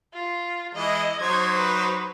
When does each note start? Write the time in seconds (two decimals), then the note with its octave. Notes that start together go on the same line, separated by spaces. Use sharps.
0.14 F4
0.75 E3 G#3 E4 D#5
1.21 F#3 D#4 C5 C6 C#6 G#6
1.56 B4